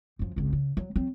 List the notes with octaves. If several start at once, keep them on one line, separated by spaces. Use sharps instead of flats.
F#2 F3
G#1 C#2
C#3
F#3
F#3 C4